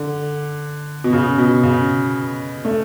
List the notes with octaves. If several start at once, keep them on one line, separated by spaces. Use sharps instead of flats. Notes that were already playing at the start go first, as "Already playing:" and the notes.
Already playing: D3
B2
C#3
B2
C#3
A3